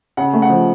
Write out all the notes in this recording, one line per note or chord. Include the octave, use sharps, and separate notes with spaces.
C#3 F#5
A3
F#5
F3